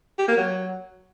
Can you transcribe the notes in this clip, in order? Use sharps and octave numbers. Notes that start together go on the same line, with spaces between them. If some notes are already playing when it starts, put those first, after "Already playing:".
G4
A#3
F#3